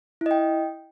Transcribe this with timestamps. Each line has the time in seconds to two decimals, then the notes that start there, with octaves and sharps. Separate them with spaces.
0.21 E4
0.26 D#5
0.31 G5